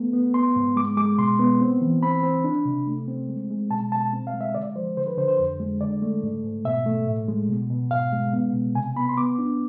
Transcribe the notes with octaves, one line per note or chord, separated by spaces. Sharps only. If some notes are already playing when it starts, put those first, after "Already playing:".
Already playing: A3 B3
B3
B3 C6
G#2
G#3 D6
G#3 D6
B2 C6
B3
C4
E3
C4 B5
C4
D4
C3
A3
C4
G#3
G#3
B2 A5
B2 A5
C4
F5
G#3
E5
D3 D5
F3 C5
D3 C5
B4
D3 C5
C5
F2
G#3
D3 D5
A3
G#2
G#2
B2 E5
A3
A2
G#3
B2
B2
G#2 F5
G#3
B3
B2
C3 G#5
B3 B5
C6
B3 D6
D4